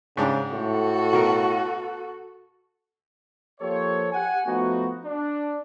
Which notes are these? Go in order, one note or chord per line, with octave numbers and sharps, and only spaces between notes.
G#2 C#3 D4 G4
A2 F#4 A4
B2 A#4
F3 A#3 G4 A4 C5 C#5
G4 F#5 G#5
F3 A3 B3 D#4 F#4
D4